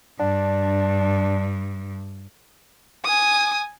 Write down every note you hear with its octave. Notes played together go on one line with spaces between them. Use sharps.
G2 D4
G#5 D#6